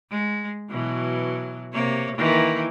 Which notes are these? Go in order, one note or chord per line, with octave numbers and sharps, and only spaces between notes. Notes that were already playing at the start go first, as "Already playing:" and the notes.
G#3
B2 E3 F#3
C3 A#3 C#5
D#3 E3 A#3